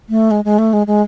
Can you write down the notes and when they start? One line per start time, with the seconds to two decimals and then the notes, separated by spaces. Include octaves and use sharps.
0.09 A3
0.31 G#3
0.45 G#3
0.58 A3
0.73 G#3
0.87 G#3